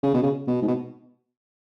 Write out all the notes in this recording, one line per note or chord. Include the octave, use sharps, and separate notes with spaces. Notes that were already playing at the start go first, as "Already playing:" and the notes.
C#3
B2
C#3
B2
G#2
B2